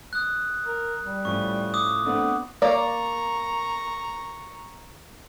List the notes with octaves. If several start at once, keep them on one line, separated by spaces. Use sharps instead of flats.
D#6 F#6
A#4
G3
A2 F3 C#4 C#6
D6 D#6
A3 B3 C4 D4
A#3 D5 A#5 C#6